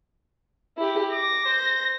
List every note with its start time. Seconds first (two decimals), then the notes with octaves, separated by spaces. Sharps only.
0.78 E4 G4
1.13 D6 A#6
1.45 C5